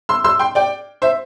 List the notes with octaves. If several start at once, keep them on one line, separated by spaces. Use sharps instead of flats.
C6 E6
C6 E6
G5 C6
D5 G5
C5 E5